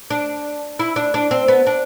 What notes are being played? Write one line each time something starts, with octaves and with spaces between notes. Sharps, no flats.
D4
E4
D4
D4
C4
B3
D4